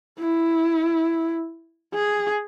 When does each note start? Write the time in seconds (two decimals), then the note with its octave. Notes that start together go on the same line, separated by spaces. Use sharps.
0.19 E4
1.94 G#4